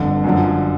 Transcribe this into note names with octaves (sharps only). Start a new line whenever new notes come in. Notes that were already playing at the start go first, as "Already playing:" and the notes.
Already playing: G1 F2 D3
F#2 D3 F3